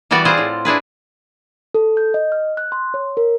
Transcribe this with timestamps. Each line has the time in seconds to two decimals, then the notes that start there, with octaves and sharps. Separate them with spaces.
0.11 E3 G3 B3 F#4 D5
0.25 C4 F4 G#4 C5 F#5
0.38 A2
0.65 D4 E4 G#4 B4
1.74 A4
1.97 G6
2.14 D#5
2.32 F6
2.57 F#6
2.72 C6
2.94 C#5
3.17 A#4